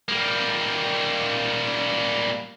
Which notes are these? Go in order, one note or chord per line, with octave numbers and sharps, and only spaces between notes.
G3 A#3